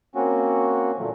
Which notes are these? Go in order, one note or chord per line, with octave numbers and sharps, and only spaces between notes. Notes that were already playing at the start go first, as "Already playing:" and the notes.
A#3 C4 C#4 F#4
A#2 D3 F3 F#3 A3